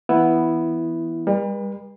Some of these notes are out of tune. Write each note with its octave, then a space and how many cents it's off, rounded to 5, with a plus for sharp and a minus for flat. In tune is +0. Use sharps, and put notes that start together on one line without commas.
E3 +0 B3 +0 E4 +0
G3 +40 B4 -40